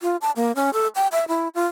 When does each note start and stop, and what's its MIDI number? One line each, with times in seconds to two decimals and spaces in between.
0.01 0.16 65
0.21 0.31 81
0.36 0.52 58
0.56 0.70 61
0.73 0.88 69
0.95 1.07 79
1.12 1.24 76
1.28 1.48 64
1.55 1.66 65